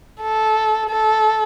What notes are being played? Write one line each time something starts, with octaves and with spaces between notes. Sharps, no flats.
A4
A4